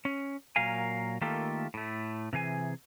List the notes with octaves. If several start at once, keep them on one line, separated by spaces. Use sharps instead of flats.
C#4
A#2 F#3 A#4 F5 G#5
D#3 A3 A#3 F4 G4 A4
A2 A3
C3 E3 G#4 G#5